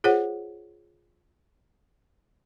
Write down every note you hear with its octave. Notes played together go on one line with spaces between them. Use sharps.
F4 G#4 C5 C#5 F#5